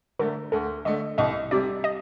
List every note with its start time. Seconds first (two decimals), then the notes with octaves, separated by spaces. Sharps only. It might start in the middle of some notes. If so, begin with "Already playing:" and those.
0.19 D3 A3 A#4
0.52 D2 A4
0.85 D3 A3 D#5
1.18 C2 D#5
1.51 C3 G3 D5
1.84 D#5